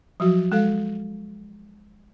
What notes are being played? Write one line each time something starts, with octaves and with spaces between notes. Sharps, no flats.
F3 F#3 F#4
G#3 A4 F5